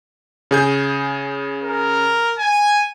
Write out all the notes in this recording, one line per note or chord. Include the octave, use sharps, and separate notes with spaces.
C#3 G#4 G6
A#4
G#5